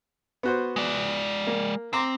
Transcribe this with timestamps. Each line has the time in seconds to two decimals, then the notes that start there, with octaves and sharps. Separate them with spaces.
0.43 B3 F#4 C5
0.76 G#3 D5
1.47 A#3
1.93 C4 A#5 C6 D6